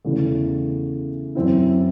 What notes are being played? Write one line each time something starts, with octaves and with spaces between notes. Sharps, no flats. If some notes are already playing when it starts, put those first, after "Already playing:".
E2 C#3 E3 A3
F#2 E3 C4 E4